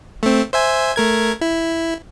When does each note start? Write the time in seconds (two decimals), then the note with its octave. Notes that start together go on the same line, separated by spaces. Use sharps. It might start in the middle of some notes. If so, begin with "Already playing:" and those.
0.23 A3 C4
0.53 C5 E5 G#5
0.96 A3 A#4 G#6
1.41 E4